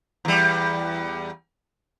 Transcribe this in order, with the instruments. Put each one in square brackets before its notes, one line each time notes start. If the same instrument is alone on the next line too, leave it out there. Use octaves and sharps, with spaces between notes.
[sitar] E2 G3